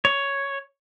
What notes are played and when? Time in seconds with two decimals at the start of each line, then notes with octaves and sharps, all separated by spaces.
0.05 C#5